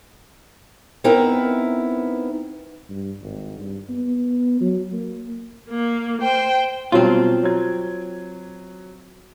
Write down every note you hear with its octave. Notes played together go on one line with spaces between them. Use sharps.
B3 C4 D#4 E4 A#4 B4
G2
G#1
G2
B3
F#3
A#3
A#3
C5 G5
B2 F#3 G3 C4 F4
F#3 G#6